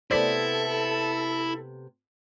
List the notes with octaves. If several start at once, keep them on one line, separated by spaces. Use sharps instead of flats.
C3 A3 B3 E4 A4 C5 D5 B6